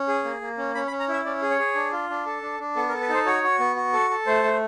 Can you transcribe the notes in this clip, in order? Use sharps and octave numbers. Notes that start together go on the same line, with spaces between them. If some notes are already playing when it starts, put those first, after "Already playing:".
Already playing: C#4
G#4
A#3
A#3
C#4
C#4 B5
B5
C#4
A#5
E4 E5
C#4 D5
G#4
C#5
G#4
D4
F4
D4
A4
D4
D4
B3 A4
A#4
A4
B4
D#4 C5
F#4 C#5
F#4
B3
F#4
A4
A4
A3 C5
A3